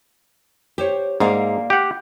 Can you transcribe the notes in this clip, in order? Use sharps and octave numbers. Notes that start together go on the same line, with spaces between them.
G4 C5 C#5
G#2 A#3 D5 F5
G4 F#5